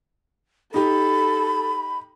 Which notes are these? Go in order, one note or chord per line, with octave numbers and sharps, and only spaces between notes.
D#4 G4 A4 B5